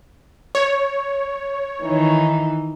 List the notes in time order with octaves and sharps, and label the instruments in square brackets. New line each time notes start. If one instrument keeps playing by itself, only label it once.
[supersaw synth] C#5
[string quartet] D#3 E3 D#4